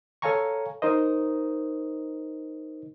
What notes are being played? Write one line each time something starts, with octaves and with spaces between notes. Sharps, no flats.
A4 C#5 F5 G#5 A#5 C#6
D#4 A#4 C5 D#5